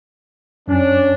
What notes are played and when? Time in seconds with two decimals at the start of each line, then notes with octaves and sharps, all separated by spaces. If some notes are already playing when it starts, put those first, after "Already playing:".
0.68 F#2 C#4 D4